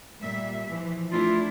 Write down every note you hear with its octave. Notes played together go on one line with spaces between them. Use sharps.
A#2 G3 E5
E3 F3
A3 D4 E4 F4